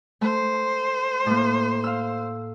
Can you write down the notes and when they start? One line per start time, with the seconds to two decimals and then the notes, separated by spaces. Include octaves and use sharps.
0.21 A3 C5
1.26 A2 A#3
1.84 F5 E6